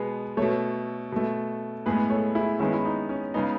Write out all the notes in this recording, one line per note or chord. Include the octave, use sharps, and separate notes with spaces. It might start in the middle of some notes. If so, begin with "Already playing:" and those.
Already playing: B2 G#3 B3 G#4
B2 A3 A4 C#5
B2 A3
A2 G#3 B3 G#4 B4
A4 C#5
E4 G#4
D#3 G#3 B3 C#4 E4
E4
D#4
C#4
C#3 G#3 B3 D#4